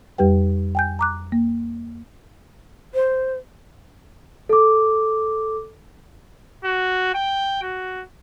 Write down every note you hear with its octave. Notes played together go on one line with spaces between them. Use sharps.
F2 G3 G4 B4 G5
G5 G#5 G6
A#5 D6 F#6
A#3
C5
A4 D6
F#4
G5
F#4